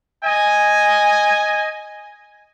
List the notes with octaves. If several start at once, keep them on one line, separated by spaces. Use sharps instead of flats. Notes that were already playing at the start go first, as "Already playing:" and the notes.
D#5 G#5